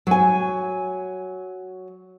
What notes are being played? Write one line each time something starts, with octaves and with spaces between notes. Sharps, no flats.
F#3 G#5